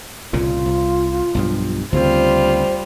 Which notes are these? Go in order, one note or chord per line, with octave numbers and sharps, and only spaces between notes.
C2 A#2 C#3 F4
C2
B1 G2 F3
D2 C#3 G3 C4 F4 C5